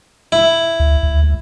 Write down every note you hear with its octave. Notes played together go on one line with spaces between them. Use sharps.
E4
D2
D2